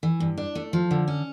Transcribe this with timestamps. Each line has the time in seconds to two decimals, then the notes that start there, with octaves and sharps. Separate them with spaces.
0.03 E3
0.20 G2
0.37 D4
0.55 A3
0.73 F3
0.91 D3
1.08 C#4